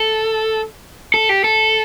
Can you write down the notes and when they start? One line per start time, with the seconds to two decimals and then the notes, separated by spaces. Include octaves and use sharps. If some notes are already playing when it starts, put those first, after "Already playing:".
Already playing: A4
1.14 A4
1.29 G4
1.44 A4